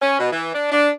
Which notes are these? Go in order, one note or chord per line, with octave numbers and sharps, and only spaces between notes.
C#4
B2
E3
D4
D4